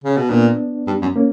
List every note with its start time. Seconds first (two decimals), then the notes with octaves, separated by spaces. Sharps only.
0.04 C#3
0.17 B2
0.30 A#2 B3 D4
0.87 G2
1.02 F#2
1.16 A#3 C#4